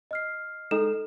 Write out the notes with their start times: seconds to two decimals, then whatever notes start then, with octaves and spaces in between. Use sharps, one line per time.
0.11 D#5 F6 C7
0.71 G#3 D#4 A4